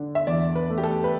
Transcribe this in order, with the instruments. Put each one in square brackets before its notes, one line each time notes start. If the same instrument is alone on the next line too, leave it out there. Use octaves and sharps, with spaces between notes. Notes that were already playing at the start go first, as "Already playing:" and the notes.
Already playing: [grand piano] D3 D4
[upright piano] E5
[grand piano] E2 [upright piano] D5
[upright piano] B4
[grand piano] A3
[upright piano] G4
A4
B4